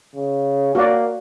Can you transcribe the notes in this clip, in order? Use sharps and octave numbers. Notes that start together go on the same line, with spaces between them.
C#3
A#3 F#4 D5